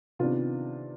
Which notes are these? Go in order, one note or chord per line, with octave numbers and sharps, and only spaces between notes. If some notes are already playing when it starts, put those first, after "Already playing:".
C3 D#3 B3 D4 F4